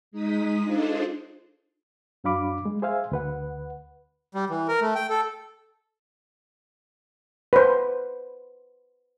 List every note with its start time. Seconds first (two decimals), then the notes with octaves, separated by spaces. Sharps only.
0.11 G#3 D#4 D#6 B6
0.63 D4 D#4 F4 G#4 A4 C5
2.24 F#2 F#3 D4 F5 B5 D6
2.66 G#3
2.82 G#4 C5 E5 F5 G#5
3.12 D2 B4 F#5
4.35 G3
4.50 E3
4.68 A#4
4.81 A3
4.95 G5
5.10 A4
7.53 B4 C5